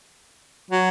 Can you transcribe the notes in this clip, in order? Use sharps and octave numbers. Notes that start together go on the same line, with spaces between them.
F#3